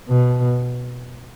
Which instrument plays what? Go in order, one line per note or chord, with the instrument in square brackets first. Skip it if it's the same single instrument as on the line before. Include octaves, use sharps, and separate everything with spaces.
[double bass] B2